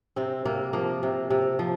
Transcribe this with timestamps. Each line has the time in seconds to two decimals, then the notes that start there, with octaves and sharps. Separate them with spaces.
0.16 C3 C4
0.45 C3 A#3
0.73 F3 A#3
1.03 C3
1.30 C3
1.59 F3